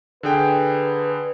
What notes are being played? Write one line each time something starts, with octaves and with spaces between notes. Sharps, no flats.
D3 G#4 B4 G5